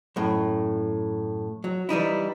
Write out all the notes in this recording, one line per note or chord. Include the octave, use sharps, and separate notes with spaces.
F#2 A2
F#3
E3 G3 D#4 E4